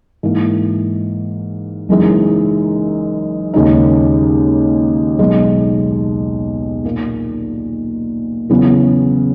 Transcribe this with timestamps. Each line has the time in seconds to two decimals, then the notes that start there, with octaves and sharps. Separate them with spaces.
0.23 G#2 E3 A#3
1.89 F#1 F#2 E3 G#3 D#4
3.54 D#2 C#3 G#3 D#4
5.19 B1 B2 G#3 D#4
6.84 A#2 A#3 D#4
8.49 E2 C#3 F#3 B3